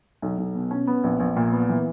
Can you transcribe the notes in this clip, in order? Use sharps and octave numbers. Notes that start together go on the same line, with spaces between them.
B1
B1
B2
C#4
B3
A#1
A#1
A#2
B3
E3